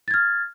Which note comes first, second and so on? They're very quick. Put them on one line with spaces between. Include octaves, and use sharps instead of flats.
A6 G#6 F6